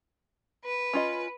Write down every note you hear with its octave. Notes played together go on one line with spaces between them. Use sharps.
B4
C#4 F4 D#5